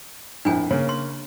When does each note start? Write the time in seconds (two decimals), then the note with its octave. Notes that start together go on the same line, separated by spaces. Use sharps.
0.45 A#1 F2 A2 D4 G#5
0.71 C#3 A#3 C#5
0.89 C6